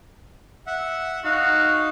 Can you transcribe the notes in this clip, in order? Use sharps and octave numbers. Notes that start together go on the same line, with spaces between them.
E5 F#5
D#4 F#4 F5